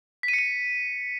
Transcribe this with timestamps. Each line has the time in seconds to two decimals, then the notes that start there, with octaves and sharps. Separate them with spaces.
0.23 B6
0.28 D#7
0.33 C#7
0.39 D#7